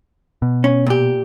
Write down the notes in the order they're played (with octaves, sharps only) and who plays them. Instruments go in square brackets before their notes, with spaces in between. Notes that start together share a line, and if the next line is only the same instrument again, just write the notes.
[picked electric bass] B2
[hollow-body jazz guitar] C#4
A#2 G4